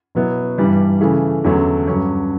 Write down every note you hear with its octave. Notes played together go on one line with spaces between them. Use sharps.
B2 F#3 B3 E4
G2 E3 G3
C#3 E3 A3
E2 D3 F#3 A3 C#4
G2 F#3 C#4